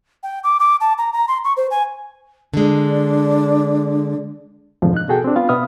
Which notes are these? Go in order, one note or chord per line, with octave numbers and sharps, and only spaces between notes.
G5
D6
D6
A5
A#5
A#5
C6
C#6
C5
G#5
D3 G#3 D4
F2 G#2 B2 D3 F3
D#4 F#6
B2 F#4 G#4 A4 G5
C4 D4
B3 F4 F5
B2 B3 E5 D#6 F6